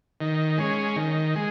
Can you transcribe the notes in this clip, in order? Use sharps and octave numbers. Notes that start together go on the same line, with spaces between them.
D#3
G#3 C#4
D#3
G#3